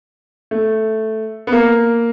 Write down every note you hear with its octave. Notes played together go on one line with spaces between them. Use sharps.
A3
B3
A#3